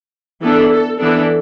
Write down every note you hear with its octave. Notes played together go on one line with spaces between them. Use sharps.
E3 B3 D4 A4
A4
E3 B3 D4 A4